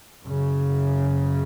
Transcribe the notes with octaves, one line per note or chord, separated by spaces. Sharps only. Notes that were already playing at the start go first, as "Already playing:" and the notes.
F#2
C#3